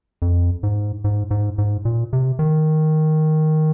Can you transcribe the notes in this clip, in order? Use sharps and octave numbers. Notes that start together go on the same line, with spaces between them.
F2
G#2
G#2
G#2
G#2
A#2
C3
D#3